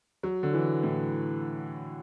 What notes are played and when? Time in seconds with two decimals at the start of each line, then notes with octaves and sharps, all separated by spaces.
0.23 F#3
0.43 D3
0.53 E3
0.83 A2